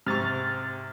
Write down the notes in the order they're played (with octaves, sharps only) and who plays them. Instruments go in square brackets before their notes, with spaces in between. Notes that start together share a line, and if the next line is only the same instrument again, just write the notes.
[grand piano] G#2 C#6 [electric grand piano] C3 [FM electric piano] F6 A6